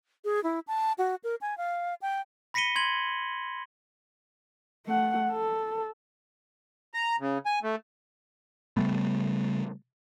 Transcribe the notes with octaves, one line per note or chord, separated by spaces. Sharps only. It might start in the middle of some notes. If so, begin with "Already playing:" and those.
G#4
E4
A5
F#4
A#4
G#5
F5
G5
B5 A#6 B6 C#7 D#7 G7
C6 G#6 F#7
A3 F#5
A4
A#5
C#3
G#5
A3
C#3 G3 A3 B3